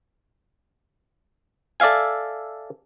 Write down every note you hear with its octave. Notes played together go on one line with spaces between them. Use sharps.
A4 D5 E5 F5 G#5